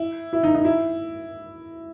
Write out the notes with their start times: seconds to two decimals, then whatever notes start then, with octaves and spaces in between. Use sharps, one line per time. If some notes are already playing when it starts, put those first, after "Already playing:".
Already playing: E4
0.33 E4
0.43 D#4
0.55 D#4
0.65 E4